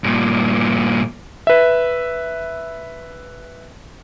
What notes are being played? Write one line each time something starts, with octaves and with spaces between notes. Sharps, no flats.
G2 A#2
B4 E5